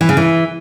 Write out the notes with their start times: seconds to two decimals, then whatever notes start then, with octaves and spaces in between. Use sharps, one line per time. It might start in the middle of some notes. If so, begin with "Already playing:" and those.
0.01 E3
0.09 C#3
0.17 E3